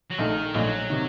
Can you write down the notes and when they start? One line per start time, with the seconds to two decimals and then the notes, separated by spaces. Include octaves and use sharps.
0.10 F#3
0.18 A#1 A#2 D#3 A3 D#4
0.54 A#1 A#2 F#3 A3 D#4
0.90 C3 D#3